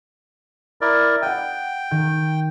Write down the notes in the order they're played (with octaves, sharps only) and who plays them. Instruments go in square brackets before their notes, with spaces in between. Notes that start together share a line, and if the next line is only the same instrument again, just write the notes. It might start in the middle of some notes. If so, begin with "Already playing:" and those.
[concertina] E4 A#4 D5
[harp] D#5 F#5 [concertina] G5
[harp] D#3 G6